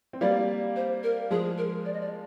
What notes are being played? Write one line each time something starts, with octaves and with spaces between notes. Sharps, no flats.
C4
G3 A#3 D5
C5
A#4
F3 G#3 G#4
A#4
D5
D#5
D5